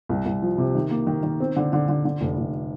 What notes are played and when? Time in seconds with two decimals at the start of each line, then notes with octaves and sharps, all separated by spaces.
0.09 C2
0.26 C2
0.42 F3
0.58 C3
0.75 D#3
0.91 A#3
1.07 D#3
1.23 D#3
1.40 C4
1.56 D3
1.73 D3
1.88 D3
2.05 D3
2.21 F1
2.37 F1